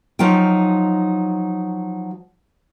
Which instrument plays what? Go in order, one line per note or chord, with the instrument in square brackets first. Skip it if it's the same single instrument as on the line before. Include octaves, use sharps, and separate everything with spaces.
[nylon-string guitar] F3 F#3 D#4 F4 G5